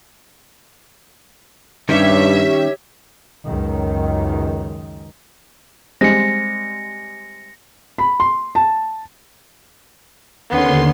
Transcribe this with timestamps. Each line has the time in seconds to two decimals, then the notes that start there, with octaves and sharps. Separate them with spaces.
1.89 G2 D#3 G3 C#4 G4 C#5 E5
3.46 C#2 F#2 D#3
6.01 G3 G#3 C4 A#6 C#7
7.98 B5
8.20 C6
8.55 A5
10.50 D#2 D3 B3 C#4 C6